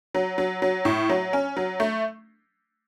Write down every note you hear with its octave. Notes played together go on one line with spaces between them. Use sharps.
F#3
F#3
F#3
A2
F#3
C#4
F#3
A3